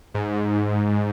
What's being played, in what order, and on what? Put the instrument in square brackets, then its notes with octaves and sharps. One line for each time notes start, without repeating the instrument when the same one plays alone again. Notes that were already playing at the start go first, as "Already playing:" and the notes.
[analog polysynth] G#2